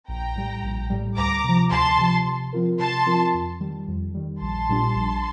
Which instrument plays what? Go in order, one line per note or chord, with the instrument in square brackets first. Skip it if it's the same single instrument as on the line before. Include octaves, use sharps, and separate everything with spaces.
[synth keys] A#1 [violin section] G5 A#5
[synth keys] A2 G3
A#1
A2 G3
[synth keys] D2 [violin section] A#5 D6
[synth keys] C3 F3
[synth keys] D2 [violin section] A5 C6
[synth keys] C3 F3
C3
F3 C4 F4 A#4
[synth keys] C3 [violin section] A5 C6
[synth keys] F3 C4 F4 A#4
F2
D#3 G3
F2
D#3 G3
[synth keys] A#1 [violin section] A5 C6
[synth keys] A#2 G3 D4
A#1